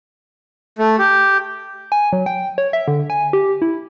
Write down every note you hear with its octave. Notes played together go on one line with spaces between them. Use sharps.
A3
G4
G#5
F#3
G5
C#5
E5
D3
G#5
G4
E4